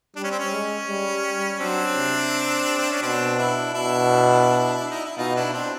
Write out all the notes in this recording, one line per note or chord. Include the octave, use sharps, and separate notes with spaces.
G3 D4
C#4
C4
C#4
G#3
G3
F#3 C4 D4
C3
C4
C#4
B2 C4 D4
D4 E4
B2 D4 E4
D4
D#4
E4
B2 D#4 F4
D4 E4
C4 D4